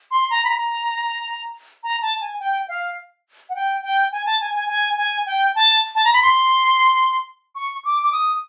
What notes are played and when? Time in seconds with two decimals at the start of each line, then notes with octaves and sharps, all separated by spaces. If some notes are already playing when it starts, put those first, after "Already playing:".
0.11 C6
0.30 A#5
0.44 B5
0.50 A#5
1.83 A#5
2.02 A5
2.21 G#5
2.40 G5
2.68 F5
3.49 F#5
3.55 G5
3.83 G5
4.12 G#5
4.26 A5
4.41 G#5
4.55 G#5
4.69 G#5
4.98 G#5
5.26 G5
5.55 A5
5.95 A5
6.05 A#5
6.13 B5
6.23 C6
7.55 C#6
7.85 D6
8.03 D6
8.12 D#6